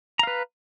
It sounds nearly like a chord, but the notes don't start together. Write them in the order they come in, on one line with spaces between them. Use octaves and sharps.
A#5 F5 B4